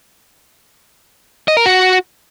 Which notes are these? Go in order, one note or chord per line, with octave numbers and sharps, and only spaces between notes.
D#5
A#4
F#4